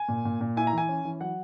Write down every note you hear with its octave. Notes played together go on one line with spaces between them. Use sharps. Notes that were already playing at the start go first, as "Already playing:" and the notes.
Already playing: G#5
A#2
A#2
A#2
E4 G#5
A#5
E3
G#5
C#4
E3
F#3 F#5